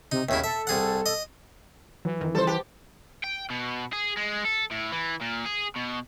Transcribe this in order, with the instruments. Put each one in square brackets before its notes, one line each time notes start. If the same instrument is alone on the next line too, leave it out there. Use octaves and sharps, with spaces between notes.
[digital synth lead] C3 [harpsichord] D#4
[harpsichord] D#2 C#3 E4 [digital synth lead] E5
[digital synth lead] A4 [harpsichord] E5
[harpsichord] C2 G#4 F#5
D#5
[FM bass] E3 [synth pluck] F#3
[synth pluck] F2 D#3
[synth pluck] C#3 F3 G3 [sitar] A4 C5
[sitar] G4 [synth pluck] B4 F#5 A5
[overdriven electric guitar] G5
B2
G#4
G#3
A4
A2
E3
A#2
G#4
B2